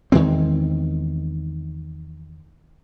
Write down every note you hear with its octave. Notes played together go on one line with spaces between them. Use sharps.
E2 D#3 G#3 C4